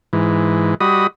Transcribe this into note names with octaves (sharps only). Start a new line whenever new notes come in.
G#2 E3
G3 F#4 D#5 B5 D#6